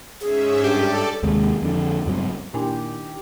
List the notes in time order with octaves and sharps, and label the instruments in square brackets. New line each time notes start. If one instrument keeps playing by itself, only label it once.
[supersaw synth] G#2 C#4 E5 [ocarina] G#4
[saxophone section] G2 [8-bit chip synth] G4 [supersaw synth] A4 D5
[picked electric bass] D#2 C3 G#3
F2 D3
F#1 G2 F#3 C4
[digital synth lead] A#2 [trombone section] D#3 G4 [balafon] D4 E4 G#5